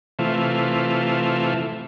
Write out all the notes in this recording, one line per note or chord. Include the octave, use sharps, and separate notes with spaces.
C3 E3 A3 F4